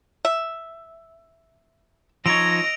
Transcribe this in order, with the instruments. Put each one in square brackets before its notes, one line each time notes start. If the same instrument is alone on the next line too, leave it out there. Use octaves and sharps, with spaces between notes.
[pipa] E5
[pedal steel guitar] F3 D#4 C#5 [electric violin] D#5 A#6 [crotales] E6 D7 F7